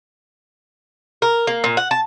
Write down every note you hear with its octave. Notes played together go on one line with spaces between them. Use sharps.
A#4
A#3
A#2
F#5
A5